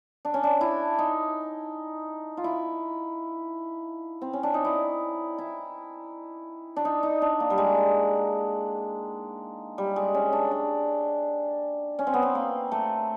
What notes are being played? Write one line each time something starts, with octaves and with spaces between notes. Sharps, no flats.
D4
C#4
D4
E4
D#4
F4
E4
C4
C#4
D4
D#4
E4
E4
D4
D#4
D#4
D4
A#3
G3
G#3
G3
G#3
C#4
D4
D4
C#4
C4
B3
C4
A#3
A3